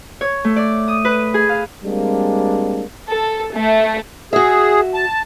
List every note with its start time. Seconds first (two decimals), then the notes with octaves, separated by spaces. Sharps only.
0.21 C#5
0.44 A3
0.56 D5
0.88 D#6
1.05 B4
1.34 G#4
1.49 F5
1.84 G3 G#3 A#3 C4 D4
3.09 A4
3.55 A3
4.33 F#4 G#4 E5
4.94 A5